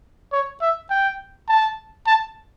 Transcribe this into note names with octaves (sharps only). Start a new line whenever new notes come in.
C#5
E5
G5
A5
A5